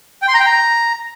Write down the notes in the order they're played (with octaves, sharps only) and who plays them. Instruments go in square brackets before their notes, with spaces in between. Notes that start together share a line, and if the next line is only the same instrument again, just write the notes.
[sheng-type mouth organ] G5
C6
A#5
G5
A#5